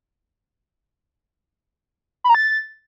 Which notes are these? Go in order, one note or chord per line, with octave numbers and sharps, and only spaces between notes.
B5
A#5
A6